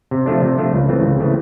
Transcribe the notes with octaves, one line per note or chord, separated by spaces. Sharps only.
C3
F3 A3 D4
C3
F3 A3 D4
C#2
C#3 E3 A3 C4
C#2
C#3 E3 A3 C4